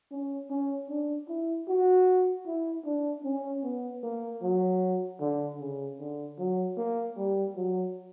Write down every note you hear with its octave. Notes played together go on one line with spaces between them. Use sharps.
C#4
C#4
D4
E4
F#4
E4
D4
C#4
B3
A#3
F#3
D3
C#3
D3
F#3
A#3
G3
F#3